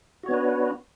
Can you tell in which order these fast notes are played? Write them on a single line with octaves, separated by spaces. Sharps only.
F#4 C#5 B3 D4 B4